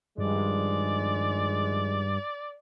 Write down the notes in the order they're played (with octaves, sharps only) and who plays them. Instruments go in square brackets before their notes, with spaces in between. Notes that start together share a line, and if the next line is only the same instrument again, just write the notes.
[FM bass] G2 [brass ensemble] D#3 F3 G#3 [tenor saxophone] D5